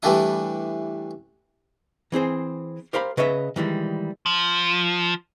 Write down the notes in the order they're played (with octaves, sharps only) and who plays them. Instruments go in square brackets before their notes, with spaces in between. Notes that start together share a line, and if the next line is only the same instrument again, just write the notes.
[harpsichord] E3 G3 A3 D4 E4 D#6
[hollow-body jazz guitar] E3 C4 G#4 C5
G4 A#4 C5 F5 B5
C#3 B4 C#5 D#5 E5
D#3 E3 G3 G#3
[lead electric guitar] F3